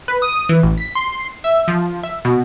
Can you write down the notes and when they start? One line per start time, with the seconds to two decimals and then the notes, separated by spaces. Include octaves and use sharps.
0.08 B4
0.22 D#6
0.49 E3
0.63 A1
0.78 B6
0.95 C6
1.44 E5
1.68 F3
2.03 E5
2.25 B2